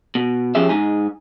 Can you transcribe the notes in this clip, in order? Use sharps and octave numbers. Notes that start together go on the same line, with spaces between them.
B2
F3 C#4 G4 G#4 E5
G#2 D#4 G#5